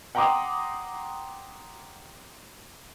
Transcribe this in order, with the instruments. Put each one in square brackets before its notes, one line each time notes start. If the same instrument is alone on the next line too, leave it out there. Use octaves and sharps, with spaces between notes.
[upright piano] F#5 G5 A#5 C6 D6 D#6